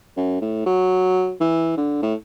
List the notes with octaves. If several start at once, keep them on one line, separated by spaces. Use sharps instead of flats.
F#2
A2
F#3
E3
D3
A2